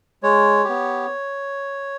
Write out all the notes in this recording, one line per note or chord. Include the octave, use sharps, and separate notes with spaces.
G#3 C#5
G4
B3